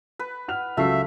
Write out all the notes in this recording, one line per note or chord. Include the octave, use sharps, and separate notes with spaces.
B4
F#5 F6 F7
C#2 F#3 A3 E5 C7